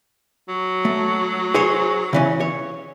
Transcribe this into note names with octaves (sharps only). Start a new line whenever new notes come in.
F#3
A3
G#4 C5 C#5
C#3 E3 C#4
C#5